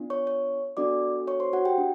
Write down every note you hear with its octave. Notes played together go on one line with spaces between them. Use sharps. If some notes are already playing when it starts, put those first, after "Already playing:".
Already playing: B3 D4 F4
C#5 C#6
C#5 C#6
B3 D4 F#4 A4 D5 D6
C#5 C#6
C5 C6
F#4 F#5
G4 G5
D4 F#4